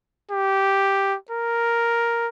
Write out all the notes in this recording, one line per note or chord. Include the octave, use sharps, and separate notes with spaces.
G4
A#4